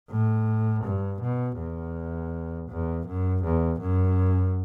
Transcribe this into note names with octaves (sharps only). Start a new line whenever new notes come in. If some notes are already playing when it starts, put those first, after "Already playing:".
A2
G2
B2
E2
E2
F#2
E2
F#2